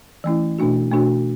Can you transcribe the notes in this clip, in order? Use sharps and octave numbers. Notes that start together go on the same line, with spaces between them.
E3 A3 C#4 E4
B2 A3 D4 F#4
B2 A3 D4 F#4